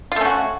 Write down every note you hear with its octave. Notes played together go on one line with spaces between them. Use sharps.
A3 C#4 F4 F#4